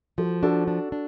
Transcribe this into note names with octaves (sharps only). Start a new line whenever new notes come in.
F3 F#4 A4
D4 F#4 A4
D4
D4